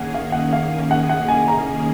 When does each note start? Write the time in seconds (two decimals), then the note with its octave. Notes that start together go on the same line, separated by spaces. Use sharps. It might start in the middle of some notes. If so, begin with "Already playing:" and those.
Already playing: D#3 A#3 C#4 G#4 F#5
0.14 F5
0.32 F#5
0.53 F5
0.91 F#5
1.09 F#5
1.28 G#5
1.48 A#5